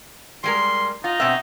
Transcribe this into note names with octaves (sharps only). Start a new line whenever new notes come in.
G3 G#3 A#4 C6
D#4 F4
B2 C4 E5